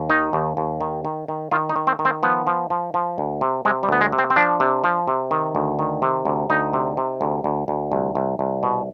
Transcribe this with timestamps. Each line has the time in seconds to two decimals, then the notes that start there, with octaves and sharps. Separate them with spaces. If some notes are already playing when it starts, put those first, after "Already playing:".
Already playing: D#2
0.10 D#3 D#4
0.33 D#2
0.57 D#2
0.81 D#3
1.05 D#3
1.28 D#3
1.51 D#3 F4
1.69 D#4
1.76 D#3
1.87 C4
1.99 D#3
2.05 C4
2.23 F3 B3
2.47 F3
2.70 F3
2.94 F3
3.18 D2
3.41 C3
3.65 C3 G#3
3.83 G3
3.89 D2 B3
4.01 G#3
4.12 C3
4.18 C4
4.30 C4
4.36 F3 D4
4.60 C3
4.84 F3
5.08 C3
5.31 D#3
5.55 D2
5.79 D#3
6.02 C3
6.25 D2
6.50 D2 D#4
6.73 C3
6.97 C3
7.21 D2
7.44 D2
7.68 D2
7.92 C2
8.15 C2
8.39 C2
8.63 B2